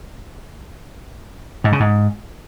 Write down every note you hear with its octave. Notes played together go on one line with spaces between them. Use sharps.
G#2
C#3
G#2